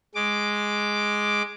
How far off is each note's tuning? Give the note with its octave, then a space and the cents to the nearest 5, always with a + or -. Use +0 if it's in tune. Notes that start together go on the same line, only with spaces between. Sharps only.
G#3 +0 D6 +0